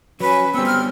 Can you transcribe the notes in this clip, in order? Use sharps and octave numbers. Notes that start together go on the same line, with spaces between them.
F#3 C#4 B4
G3 B3 C4 E6
F6